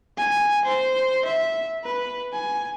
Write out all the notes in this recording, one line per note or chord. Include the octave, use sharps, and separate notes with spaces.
G#5
C5
E5
B4
G#5